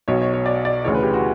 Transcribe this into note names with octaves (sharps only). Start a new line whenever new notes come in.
B1 B2 C#5
C#5
C#5
D5
D5
D2 C#3 E3 C#5
B4
G4
F#4